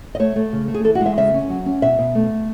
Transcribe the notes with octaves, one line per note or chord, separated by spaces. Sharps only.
D#5
A3 C#5
A3
C#3
A3
G#4
E3 A4
F#4
G#3
E5
C#3 E5
C#4
F#3
C#4
B2 E5
B2
A3